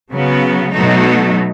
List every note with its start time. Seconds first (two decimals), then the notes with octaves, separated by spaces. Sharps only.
0.11 C#3 F#3 B3
0.73 B2 F#3 A3 D#4